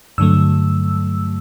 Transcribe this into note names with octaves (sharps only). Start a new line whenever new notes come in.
G2 D3 F#3 A3 E6